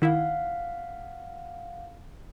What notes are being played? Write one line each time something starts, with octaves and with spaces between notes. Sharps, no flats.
D#3 E4 F5 F#5